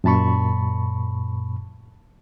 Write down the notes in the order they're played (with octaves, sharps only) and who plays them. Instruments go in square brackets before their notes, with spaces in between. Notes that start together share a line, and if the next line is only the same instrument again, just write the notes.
[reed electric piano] F#2 A#2 A5 B5 C#6